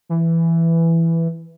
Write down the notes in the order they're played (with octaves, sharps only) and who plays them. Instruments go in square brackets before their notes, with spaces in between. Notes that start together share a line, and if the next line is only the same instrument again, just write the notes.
[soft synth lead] E3